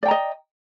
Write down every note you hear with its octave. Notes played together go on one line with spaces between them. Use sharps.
D5 D#5 G5 A#5